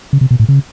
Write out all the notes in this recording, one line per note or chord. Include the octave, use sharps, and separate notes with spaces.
C#3
C3
B2
A2
C#3